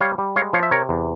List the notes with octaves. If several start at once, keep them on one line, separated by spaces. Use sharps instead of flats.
G3 C#5 F5
G3
G#3 C#5 F5
F3 C#5 F5
E5
C3 A#4 C#5
E2